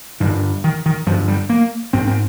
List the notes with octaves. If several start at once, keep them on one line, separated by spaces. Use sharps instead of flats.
G2 D3 D#3
D#3
D#3
G2 D3 F3
G3
A#3
G#2 C4
C4